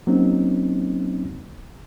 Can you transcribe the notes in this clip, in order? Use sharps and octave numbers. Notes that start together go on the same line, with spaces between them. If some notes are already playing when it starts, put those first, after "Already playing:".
F#3 A#3 C4 C#4 D#4